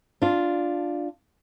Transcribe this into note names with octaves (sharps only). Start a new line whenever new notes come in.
D4 F4